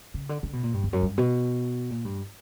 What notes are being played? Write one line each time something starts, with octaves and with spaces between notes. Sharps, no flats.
C#3
D3
D3
B2
A#2
G2
E2
F#2
G2
B2
A#2
G2